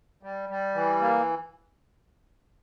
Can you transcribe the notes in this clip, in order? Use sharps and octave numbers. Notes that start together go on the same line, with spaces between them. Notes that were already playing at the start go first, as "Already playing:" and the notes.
G3
G3
E3
A#3